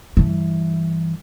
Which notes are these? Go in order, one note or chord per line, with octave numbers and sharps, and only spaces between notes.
G2 E3